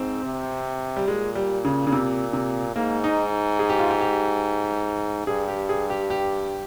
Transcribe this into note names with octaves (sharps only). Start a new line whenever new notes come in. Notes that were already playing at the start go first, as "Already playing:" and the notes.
Already playing: G#2 C4
C3
G3
A#2 G#3
G3
C#3
C#3
C3
C3
G#2 A#3
D#4
G#4
G4
F4
G4
G4
G2 G#4
G4
G#4
G4
G4